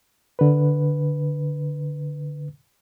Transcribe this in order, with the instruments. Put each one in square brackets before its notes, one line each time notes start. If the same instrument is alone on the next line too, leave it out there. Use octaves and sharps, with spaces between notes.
[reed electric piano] D3 B4